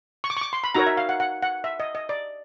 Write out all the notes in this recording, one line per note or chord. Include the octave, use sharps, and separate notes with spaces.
C#6
D6
C#6
D6
C6
B5
D#4 F#4 A#4 C#5 A#5
E5
F5
F#5
F#5
F#5
E5
D#5
D#5
D5